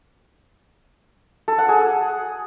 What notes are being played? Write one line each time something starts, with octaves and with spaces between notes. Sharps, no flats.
A4
F#5
G#4